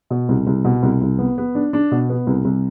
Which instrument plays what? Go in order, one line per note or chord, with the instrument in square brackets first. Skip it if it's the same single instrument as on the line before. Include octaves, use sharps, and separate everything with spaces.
[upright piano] B2
C2
C2
B2
C2
C2
B3
B3
D4
D4
B2
B3
C2
C2